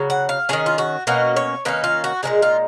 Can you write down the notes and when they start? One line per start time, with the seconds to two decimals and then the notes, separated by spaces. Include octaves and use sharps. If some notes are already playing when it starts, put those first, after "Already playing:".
Already playing: C#3 F#3
0.10 F#5
0.29 F5
0.49 F#3 C#4 G#4
0.53 D#3
0.66 F4
0.78 F#4
1.07 B2 A#3 C#4 F#4
1.36 C#5
1.65 D#3 A#3 C#4 B4
1.84 F4
2.04 F#4
2.23 A#2 F3 G#3 D#4 G#4
2.42 F4